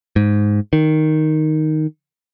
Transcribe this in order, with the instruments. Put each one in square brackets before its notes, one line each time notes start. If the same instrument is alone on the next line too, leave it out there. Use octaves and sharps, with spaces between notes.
[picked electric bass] G#2
D#3